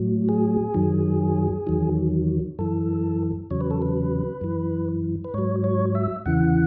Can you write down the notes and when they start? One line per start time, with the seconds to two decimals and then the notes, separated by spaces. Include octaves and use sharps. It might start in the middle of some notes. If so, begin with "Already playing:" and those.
Already playing: A2 F#3
0.29 G#4
0.74 F#2 D#3 F#3
1.67 E2 D#3 F#3
2.59 F#2 E3 A4
3.50 E2 C#3 F#3 C#5
3.61 B4
3.71 A4
3.82 B4
4.41 F#2 E3
5.24 B4
5.34 G#2 F#3 C#5
5.64 C#5
5.95 E5
6.26 E2 C#3 E3 F#5